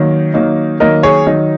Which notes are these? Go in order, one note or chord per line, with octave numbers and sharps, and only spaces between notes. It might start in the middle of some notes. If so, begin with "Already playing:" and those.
Already playing: D#3 F#3 A#3 D#4
D#3 F#3 A#3 D#4
D#3 F#3 A#3 D#4 A#4 D#5
G#4 C#5
D#3 F#3 D#4